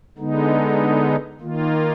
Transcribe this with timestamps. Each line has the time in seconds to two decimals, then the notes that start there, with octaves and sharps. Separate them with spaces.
0.18 D3 G#3 B3 D#4
1.40 D#3 A#3 F4